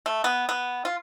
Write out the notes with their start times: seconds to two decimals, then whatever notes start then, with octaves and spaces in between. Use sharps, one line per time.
0.06 A3
0.24 B3
0.49 B3
0.85 F4